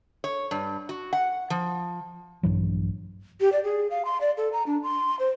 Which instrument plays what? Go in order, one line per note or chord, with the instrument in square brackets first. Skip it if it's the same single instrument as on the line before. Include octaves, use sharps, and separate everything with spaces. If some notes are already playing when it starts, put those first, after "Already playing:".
[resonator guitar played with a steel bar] C#5
G2
F#4
F#5
F3
[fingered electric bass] A#1 G2 E3 F#3
[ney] G4
D5
G#4
F5
C6
D5
A4
A#5
D4
C6
C5